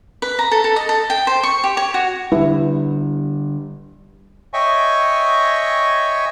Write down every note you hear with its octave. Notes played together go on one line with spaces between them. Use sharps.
B4
A#5
A4
A4
D#5
A4
G5
C5
C#6
G4
C#5
F#4
D3 G3 E4 B4
C#5 D#5 E5 G5 G#5 C#6